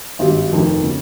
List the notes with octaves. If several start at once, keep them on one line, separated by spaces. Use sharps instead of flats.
G#1 G2 G3
F1 F2 D#3
C#3